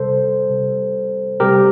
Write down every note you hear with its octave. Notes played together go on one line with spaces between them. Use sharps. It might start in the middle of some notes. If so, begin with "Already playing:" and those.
Already playing: C3 G3 A4 C5
C3 G3
C3 G3 G4 A#4